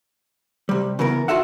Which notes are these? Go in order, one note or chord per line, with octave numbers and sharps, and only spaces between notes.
C3 G3
C#3 E3 B3 A#4
F4 F#4 A4 E5 F#5